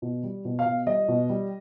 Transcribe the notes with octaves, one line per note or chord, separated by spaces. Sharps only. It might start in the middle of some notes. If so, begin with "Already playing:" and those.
B2
G3
B2
F5
B2
G3 D#5
B2
G3